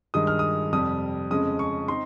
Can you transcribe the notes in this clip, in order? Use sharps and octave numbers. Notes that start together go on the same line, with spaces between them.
G2 D#3 G#3 D#6
F6
D#6
F2 C3 G3 D#6
F2 C#3 G#3 C#4 D#6
C#6
C4 D#4 C6